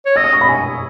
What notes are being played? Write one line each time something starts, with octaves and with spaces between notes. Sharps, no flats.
C#5
D#5 E6
D#6
C#6
B5
G#5